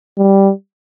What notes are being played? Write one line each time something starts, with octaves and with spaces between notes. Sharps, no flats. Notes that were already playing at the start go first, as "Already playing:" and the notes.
G3